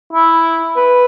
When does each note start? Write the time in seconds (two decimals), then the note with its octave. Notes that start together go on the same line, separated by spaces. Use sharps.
0.13 E4
0.76 B4